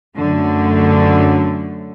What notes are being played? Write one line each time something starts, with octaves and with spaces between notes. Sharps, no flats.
F#2 D3 A3